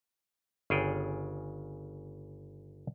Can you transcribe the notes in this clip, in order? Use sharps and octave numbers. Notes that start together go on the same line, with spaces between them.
G1 C#3 G#4 C#5 D5 G5